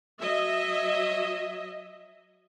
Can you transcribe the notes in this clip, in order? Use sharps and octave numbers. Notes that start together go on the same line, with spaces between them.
F#3 D#5 E5